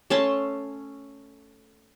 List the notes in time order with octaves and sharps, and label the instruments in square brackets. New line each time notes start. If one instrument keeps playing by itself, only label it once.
[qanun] A3 C#4 A5 C6